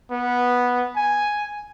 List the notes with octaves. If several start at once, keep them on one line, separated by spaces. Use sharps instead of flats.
B3
G#5